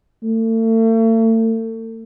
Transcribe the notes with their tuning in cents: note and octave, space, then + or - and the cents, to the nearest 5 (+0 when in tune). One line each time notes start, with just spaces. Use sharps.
A3 +40